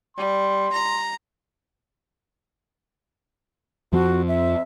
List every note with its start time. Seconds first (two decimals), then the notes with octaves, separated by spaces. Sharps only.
0.17 G3 C6
0.73 A#5
3.93 F2 F3 C4 F#4
4.28 E5